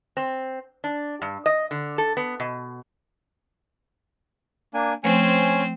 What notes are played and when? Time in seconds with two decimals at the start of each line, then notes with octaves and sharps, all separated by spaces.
0.17 C4
0.84 D4
1.22 G2
1.46 D#5
1.71 D3
1.98 A4
2.17 B3
2.40 B2
4.74 A#3 D4 G#5
5.04 F3 A3 C4 C#4 C5 G#5